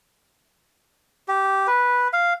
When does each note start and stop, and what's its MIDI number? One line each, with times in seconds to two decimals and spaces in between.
1.28 1.67 67
1.67 2.08 71
2.13 2.34 77